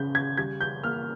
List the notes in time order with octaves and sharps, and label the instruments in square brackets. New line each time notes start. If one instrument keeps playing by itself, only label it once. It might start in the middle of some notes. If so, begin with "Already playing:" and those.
Already playing: [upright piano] C#3 G6
G#6
G3 G#6
G6
A#3 F6